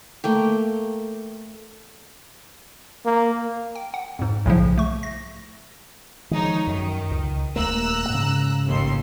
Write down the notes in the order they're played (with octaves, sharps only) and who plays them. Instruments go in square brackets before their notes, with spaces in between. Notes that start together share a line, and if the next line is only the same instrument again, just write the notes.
[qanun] A3 A#3 G5
[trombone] A#3
[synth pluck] G5
F#5
F2 G#2
B1 A2 C#3 F3
A3 C#6
A#6
[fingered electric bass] D#3 F3 [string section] G#3 D#4 C#5
[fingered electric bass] F#2 [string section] D#3
[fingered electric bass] C#2
[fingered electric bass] D#1 A3 A#3 [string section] A#5 E6 F#6
[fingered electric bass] G#2 C#3
[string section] A1 D#2 C6